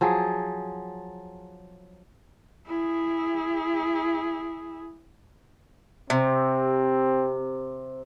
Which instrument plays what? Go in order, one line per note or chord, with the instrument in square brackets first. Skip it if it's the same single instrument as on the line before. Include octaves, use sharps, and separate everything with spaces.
[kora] F3 F#3 G#4
[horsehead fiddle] E4 G#4
[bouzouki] C3 [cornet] C4